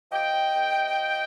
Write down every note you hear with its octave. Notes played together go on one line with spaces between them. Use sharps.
F3 D#5 G5
F3
F2
C3
F3